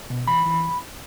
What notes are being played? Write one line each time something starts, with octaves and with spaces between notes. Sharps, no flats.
B2
E3 B5
E3